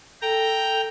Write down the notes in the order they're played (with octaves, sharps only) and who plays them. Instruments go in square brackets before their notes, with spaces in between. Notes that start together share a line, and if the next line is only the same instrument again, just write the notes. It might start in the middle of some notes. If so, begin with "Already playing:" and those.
[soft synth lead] A4 [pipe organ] G5 A#5